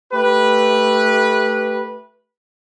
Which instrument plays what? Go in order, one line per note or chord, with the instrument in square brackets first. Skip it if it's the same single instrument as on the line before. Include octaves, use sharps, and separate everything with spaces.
[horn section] A3 G4 B4